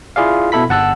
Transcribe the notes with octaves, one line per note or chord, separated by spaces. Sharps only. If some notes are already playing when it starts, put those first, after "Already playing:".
E4 F4 G#4 D5 F5
B2 E4 A4 B5 B6
G1 F#5 A5 E6 F#6